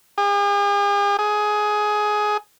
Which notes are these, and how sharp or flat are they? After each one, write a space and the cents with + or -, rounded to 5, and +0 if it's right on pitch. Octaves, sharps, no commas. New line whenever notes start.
G#4 -45
G#4 +15